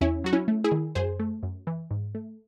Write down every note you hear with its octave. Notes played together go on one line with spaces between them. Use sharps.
E2 C#4 E4
F#3 F#4
C#4 E4
A3
E4 G#4
D#3
F#2 G#4 C5
A3
F#2
E3
G#2
A3